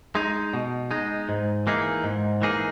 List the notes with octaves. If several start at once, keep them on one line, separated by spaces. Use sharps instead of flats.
G#3 D#4
B2
G#3 D#4
G#2
E3 A#3 D#4 G#4
G#2
E3 A#3 D#4 G#4